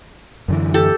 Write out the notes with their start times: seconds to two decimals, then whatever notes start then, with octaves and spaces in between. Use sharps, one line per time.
0.48 F#2 D3 E3
0.74 G4 A4